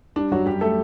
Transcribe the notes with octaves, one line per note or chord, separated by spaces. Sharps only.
G3 D4
F#2 F#3 F#4
F#2 G3 G4
A3 A4